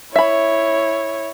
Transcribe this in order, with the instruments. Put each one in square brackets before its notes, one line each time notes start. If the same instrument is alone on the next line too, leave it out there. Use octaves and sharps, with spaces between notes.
[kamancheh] E4 C#5 [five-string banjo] E5 B5